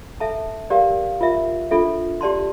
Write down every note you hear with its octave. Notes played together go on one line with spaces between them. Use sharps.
A4 E5 A5
G4 A#4 D5 F5
F4 A#4 E5
D4 F4 A4 E5
G4 D5 A5 C6